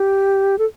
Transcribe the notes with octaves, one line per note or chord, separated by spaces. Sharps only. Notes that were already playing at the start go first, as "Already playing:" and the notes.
Already playing: G4
A4